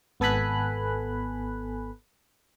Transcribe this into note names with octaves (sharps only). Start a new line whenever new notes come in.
G#1 B3 A4 G#5 B5 F#6